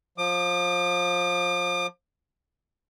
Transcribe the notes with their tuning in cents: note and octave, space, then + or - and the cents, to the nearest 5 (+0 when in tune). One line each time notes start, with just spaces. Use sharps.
F3 +25 D6 +40